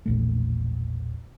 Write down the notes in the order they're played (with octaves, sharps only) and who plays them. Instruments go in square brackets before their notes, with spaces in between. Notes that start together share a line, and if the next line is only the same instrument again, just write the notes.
[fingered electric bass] E1 A#1 A3